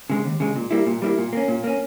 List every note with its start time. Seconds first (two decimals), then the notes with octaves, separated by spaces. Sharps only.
0.10 C#3 G#3
0.24 D#2
0.40 C#3 G#3
0.56 A#2
0.71 G3 A#3 E4
0.86 A#2
1.02 G3 A#3 E4
1.18 A#2
1.33 A#3 C#4
1.48 A#2
1.64 A#3 C#4